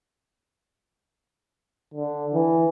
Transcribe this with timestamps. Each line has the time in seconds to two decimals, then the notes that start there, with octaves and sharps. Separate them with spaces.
1.94 D3
2.34 E3